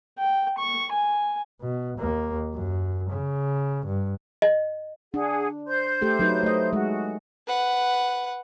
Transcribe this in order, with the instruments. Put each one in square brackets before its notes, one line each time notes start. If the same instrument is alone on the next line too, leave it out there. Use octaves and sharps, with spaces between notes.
[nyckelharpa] G5
C#6
G#5
[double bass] B2
D#2 A#3
F#2
C#3
G2
[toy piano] D#5
[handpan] D4 [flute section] G#4 F#5
[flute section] C5 C6 G6
[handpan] A3 G4 A4
F#3 D#4 B4
A3 D#5
[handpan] G#3 [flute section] F#4
[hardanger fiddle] B4 F#5